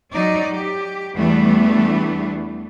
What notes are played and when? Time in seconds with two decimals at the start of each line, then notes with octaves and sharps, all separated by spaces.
0.12 F#3 D#4 D5
0.52 G4
1.16 E2 E3 G3 A3 B3 D4